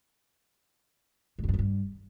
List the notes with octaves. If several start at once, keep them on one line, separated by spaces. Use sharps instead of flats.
G#2
F2
G2
F2
G2